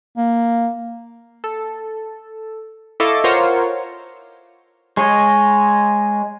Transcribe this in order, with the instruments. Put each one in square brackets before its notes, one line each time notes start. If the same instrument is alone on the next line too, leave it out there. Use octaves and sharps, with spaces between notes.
[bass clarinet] A#3
[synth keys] A4
E4 A4 D#5 F5 C#6 D6
F4 A#4 C5 C#5 F5 F#5
[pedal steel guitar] G#3 C#5 D#5